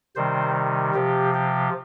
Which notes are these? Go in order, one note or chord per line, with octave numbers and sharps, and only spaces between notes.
C3 D#3 G3 C5
C3 F3 G4
G4